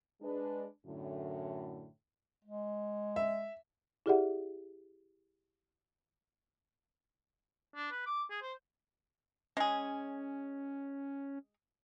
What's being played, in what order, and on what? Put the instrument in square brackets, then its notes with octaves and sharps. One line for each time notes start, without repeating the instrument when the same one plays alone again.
[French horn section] G#3 D4 B4
F#2 A2 D3
[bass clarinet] G#3
[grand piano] E5
[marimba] E4 G4 G#4 D5 E5 F#5
[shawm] D4
B4
D6
G#4
C5
[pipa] G#3 G#4 [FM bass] C#4